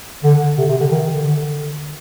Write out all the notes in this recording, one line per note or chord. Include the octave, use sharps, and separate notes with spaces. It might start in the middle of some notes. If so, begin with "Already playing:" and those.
D3
C3
C3
D3
D#3
D3